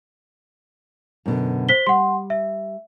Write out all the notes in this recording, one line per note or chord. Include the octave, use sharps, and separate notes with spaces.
F#2 B2 D3
C5 B6 G7
G3 F#5 C6
E5